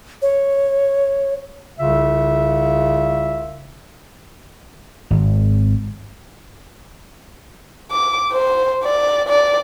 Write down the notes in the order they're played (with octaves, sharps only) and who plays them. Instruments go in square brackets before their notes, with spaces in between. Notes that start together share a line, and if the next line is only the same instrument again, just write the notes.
[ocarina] C#5
[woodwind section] C2 C#3 F4 E5
[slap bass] G#1
[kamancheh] D6
C5
D5
D5